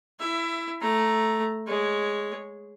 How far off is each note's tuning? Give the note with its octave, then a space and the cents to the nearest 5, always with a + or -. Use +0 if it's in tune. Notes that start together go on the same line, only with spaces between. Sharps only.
E4 +10 E5 +25
A3 +0 A#5 +0
G#3 +0 C#5 +0